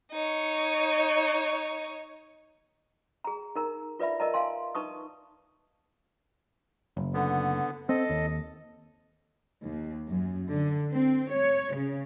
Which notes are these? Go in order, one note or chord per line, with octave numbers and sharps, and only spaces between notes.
D#4 C#5
G#4 A#5
D#4 A#4 A#5
F4 B4 D5 E5 B5
A#4 D5 D#5 A5 A#5
F5 G#5 C6
D#4 B4 A5 C#6 D#6
F#1
D3 B3
C4 A4 D#5
D#2
D#2
F#2
D3
C4
C#5
C#3